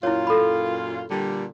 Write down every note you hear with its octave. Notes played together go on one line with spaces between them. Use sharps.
F#2 A#2 E4 F4 C#5
A4 B5
A#2 D3 G3